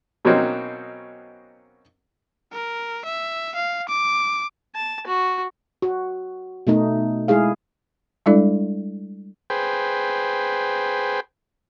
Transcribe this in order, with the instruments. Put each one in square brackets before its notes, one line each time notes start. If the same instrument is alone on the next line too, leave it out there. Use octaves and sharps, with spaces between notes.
[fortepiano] B2 F#3 A#3 C4 C#4 D#4
[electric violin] A#4
E5
F5
D6
[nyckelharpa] A5
F#4
[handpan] F#4
B2 A3 D#4
G#3 E4 G#4 F5
[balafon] G3 G#3 D4 E4 A4 D5
[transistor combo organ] G#4 B4 C5 G5